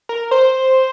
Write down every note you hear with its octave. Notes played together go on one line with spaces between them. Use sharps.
A#4
C5